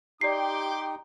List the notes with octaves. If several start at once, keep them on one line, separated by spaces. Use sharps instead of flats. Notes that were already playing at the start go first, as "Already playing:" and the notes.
D#4 G4 D5 G5 C6 D6 C7